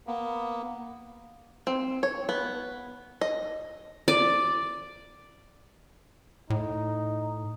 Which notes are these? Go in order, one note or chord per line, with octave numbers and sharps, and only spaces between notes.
A#3 B3
C4
C#5
B3
D#5
D5
A2 D#4